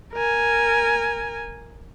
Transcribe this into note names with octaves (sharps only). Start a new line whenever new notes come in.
A#4 G#5